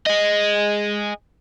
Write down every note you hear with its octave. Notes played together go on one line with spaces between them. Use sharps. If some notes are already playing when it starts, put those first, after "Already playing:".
G#4 D#5